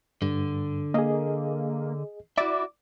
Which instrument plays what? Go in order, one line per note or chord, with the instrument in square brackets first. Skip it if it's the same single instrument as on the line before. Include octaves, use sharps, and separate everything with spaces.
[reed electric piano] G2 [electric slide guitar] D3
[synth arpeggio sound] A#3 [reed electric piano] G#4 D#5
[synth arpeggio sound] E4 D5 D6 [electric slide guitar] F#4 E5